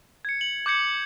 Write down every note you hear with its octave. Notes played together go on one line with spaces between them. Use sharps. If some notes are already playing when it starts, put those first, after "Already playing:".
G#6 C#7
F#7
D6 G6 G#6 C#7